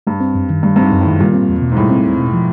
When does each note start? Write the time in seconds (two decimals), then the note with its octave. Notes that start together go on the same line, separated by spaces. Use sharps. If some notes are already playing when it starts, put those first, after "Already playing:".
0.07 G2 G3
0.20 C4
0.35 F#2
0.50 D#3
0.63 G2 G3
0.76 G2 C4
0.83 G#2
0.92 F#2
1.01 A2
1.06 D#3
1.20 A#2 G3
1.34 C4
1.49 E2
1.62 B2
1.72 G#2
1.77 A2 G3
1.90 C4
2.05 E2
2.19 B2
2.33 F3